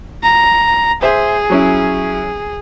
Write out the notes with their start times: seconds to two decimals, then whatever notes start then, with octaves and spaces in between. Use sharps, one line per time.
0.23 A#5
1.02 G#4 C5 E5
1.50 F#3 C#4 E4